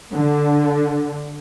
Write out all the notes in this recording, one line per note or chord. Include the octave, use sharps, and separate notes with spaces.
D3